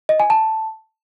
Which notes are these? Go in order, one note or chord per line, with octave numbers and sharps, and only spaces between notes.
D#5
G#5
A5